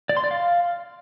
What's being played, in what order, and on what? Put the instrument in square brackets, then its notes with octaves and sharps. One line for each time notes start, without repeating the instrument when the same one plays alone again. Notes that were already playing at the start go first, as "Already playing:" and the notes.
[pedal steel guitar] D5
C6
D5
F5